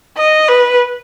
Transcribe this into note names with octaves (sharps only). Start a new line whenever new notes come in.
D#5
B4